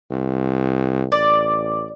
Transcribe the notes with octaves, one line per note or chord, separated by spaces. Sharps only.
C2
A1 D5